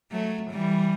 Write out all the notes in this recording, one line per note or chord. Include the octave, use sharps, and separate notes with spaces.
F#3 A3
E3 G3